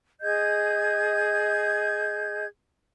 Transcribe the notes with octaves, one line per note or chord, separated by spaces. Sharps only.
G#4 D#5 G6 G#6